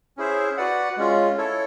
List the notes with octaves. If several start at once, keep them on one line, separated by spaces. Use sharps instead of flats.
C#4 E4 G#4 C5 E5
F#4 B4 D5 F#5
G#3 C#4 F4
E4 A4 C#5